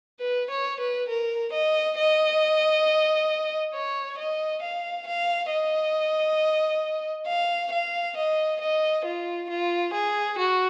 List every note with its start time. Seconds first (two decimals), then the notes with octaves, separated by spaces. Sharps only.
0.20 B4
0.50 C#5
0.80 B4
1.09 A#4
1.53 D#5
1.98 D#5
3.75 C#5
4.18 D#5
4.62 F5
5.07 F5
5.51 D#5
7.27 F5
7.72 F5
8.17 D#5
8.61 D#5
9.05 F4
9.50 F4
9.94 G#4
10.38 F#4